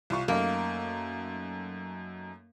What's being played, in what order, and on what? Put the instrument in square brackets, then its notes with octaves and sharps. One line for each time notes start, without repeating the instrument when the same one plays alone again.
[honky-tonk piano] C2 F4 C#6
[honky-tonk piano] F#2 A3 D#4 [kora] A#3